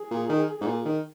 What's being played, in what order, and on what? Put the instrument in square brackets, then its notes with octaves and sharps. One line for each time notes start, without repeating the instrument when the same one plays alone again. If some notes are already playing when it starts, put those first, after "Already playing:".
Already playing: [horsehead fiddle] G#4
[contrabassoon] A#2
D#3
G#2
A#2
D#3